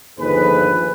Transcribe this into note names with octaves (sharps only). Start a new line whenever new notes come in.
G1 D#2 F3 G#4 B4